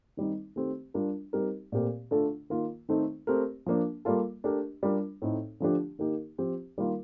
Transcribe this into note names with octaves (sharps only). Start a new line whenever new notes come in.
D#3 G3 C4 D#4
D#3 A3 C4 G4
G3 D4 F4 A#4
G3 C4 D#4 G4 A#4
A#2 A3 C4 G4 A#4
D3 A3 D4 F4 A4
D#3 A#3 F4
D#3 A3 C4 D#4 A4
A3 C4 G4 A#4
F3 A#3 D4
G3 A#3 F4 A4
A3 D4 G4 A#4
G3 D4 F4 A#4
A2 A3 C4 D#4
D3 F3 A3 D4 G4
D#3 A#3 D#4 G4 A#4
F3 C4 G4
D#3 G3 A#3 F4 A#4